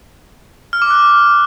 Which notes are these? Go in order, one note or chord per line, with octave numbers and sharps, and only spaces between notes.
F6
D6
F#6